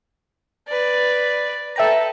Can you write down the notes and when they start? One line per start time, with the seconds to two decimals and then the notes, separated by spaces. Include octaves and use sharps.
0.68 B4 D5
1.76 A4 B4 E5 G5 A#5